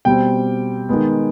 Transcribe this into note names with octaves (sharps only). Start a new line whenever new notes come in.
B2 G3 C4 G5
D#3 G#3 B3